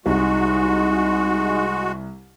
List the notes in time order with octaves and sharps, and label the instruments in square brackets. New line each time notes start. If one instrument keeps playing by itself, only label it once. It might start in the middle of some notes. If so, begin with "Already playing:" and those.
[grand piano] C2 [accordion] G#3 F#4 [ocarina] D#4